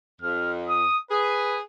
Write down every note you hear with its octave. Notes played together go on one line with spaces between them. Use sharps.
F2 F6
D#6
G#4 B4